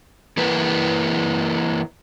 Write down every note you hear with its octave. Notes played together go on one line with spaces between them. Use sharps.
E3 A#3 B4